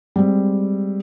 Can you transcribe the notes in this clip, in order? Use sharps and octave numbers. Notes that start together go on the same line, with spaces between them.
G3 G#3 C4